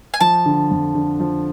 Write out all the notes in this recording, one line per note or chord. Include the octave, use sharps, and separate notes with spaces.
G#5
F3 A5
D3
F2
D3
F3